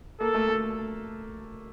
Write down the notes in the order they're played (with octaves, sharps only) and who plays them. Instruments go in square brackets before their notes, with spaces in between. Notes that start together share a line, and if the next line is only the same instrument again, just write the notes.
[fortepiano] A#3 [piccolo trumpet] A4
[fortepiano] A3
A3